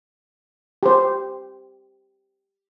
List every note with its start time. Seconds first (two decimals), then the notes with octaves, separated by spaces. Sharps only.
0.83 G4 C5